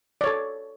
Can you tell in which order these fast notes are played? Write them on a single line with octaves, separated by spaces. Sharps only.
D5 C#5 A4